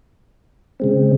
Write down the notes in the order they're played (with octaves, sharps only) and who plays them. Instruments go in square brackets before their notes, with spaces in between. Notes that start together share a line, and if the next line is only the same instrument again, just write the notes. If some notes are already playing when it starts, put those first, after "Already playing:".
[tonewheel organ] C#3 G#3 C4